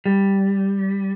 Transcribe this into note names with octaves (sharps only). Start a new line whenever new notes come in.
G3